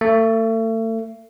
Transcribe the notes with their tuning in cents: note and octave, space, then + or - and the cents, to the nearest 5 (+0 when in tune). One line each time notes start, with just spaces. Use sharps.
A3 +35